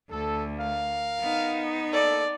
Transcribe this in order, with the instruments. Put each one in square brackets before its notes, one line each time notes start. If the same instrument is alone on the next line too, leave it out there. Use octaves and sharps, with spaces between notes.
[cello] D2 [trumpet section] A4
[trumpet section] A#4 F5
[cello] B3 D#4
[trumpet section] A#3 A4 [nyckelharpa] D5